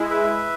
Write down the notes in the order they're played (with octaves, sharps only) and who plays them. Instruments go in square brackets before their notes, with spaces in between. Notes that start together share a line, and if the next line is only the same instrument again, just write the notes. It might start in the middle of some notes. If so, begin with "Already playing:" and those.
Already playing: [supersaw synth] G#3 E4
[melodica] B4 E5